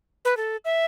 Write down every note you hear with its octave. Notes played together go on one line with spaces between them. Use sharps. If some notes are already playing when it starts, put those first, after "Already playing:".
B4
A4
E5